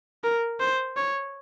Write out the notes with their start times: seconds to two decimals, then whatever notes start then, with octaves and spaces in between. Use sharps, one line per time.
0.24 A#4
0.60 C5
0.97 C#5